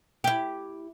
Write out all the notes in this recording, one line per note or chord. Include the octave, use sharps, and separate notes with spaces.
E4 G4